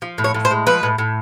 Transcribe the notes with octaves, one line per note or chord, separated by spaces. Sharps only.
F3
A2
C#5
A2
C5
G#3
F3 B4
A2
A2